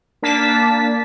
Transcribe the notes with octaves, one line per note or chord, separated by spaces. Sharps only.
A#3 D4 A5 B6